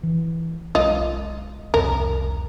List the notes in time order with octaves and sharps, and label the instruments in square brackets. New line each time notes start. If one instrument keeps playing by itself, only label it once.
[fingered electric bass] E3
[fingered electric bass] B1 G#3 C#4 [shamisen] F4 D#5
[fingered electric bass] C2 F2 B2 [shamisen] A#4